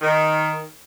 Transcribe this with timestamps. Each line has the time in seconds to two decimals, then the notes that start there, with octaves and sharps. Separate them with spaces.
0.02 D#3